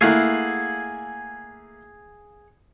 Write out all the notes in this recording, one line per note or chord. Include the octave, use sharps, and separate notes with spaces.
A3 A#3 E4 G#4 F5 F#5